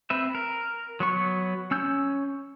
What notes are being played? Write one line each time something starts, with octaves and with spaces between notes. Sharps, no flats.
C4 B4 E5
A#4
F#3 B3 C#6
C#4 E6 G6